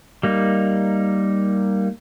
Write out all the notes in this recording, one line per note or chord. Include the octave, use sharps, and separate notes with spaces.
G3 A#3 D#4